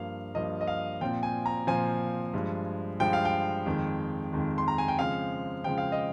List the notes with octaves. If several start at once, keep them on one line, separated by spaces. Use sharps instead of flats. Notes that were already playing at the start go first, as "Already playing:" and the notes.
Already playing: G2 F3 A#3 F5
G2 F3 A#3 D#5
D#5
F5
A#2 F3 C4 G5
G#5
A#5
A#2 F3 C4 G#5
G2 F3 G#3
G2 F3 G#3 G5
F5
G5
F2 D#3 G#3
F2 D#3 G#3
C6
A#5
G#5
G5
C#3 F3 G#3 C4 F5
C#3 F3 G#3 C4 G5
F5
D#5